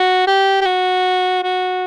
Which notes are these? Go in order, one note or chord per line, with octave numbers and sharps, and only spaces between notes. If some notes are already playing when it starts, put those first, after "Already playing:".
Already playing: F#4
G4
G4
F#4
F#4